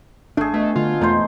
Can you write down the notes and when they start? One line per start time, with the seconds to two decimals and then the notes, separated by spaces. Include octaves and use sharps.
0.37 A1 A3 D4 G#4
0.54 B2 A3
0.76 D3 A3 F4
1.01 E1 F2 A3 D#4 C5